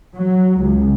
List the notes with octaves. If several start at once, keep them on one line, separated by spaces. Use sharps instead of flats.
F#3
C#2